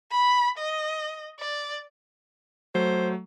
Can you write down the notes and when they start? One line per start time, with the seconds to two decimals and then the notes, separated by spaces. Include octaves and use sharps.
0.11 B5
0.58 D#5
1.39 D5
2.75 F#3 A3 C5